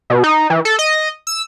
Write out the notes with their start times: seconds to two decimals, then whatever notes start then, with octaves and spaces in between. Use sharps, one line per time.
0.10 B2
0.24 D#4
0.50 E3
0.65 A4
0.79 D#5
1.27 E6